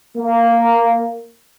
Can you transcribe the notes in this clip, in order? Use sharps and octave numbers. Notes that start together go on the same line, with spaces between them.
A#3